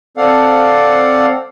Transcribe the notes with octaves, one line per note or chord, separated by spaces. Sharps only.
C4 A4 D5 F5 F#5